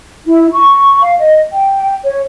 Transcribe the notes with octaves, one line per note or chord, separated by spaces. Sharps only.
E4
C#6
F5
D#5
G5
C#5